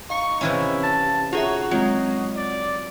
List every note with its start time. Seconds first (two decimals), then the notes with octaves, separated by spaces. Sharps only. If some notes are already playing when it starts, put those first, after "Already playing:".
0.10 D#4 F5 C#6
0.41 C3 E3 C#4 E4
0.83 A5
1.33 D#4 F4 F#4 G#4 C#5 E5
1.71 F#3 G#3 C4 F4 D#5
2.37 D5